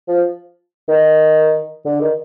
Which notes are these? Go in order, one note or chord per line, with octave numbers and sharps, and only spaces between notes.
F3
D#3
D3
D#3